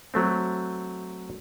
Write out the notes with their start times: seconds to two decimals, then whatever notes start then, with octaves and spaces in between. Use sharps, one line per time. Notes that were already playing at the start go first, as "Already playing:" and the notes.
0.14 F#3 A3 C4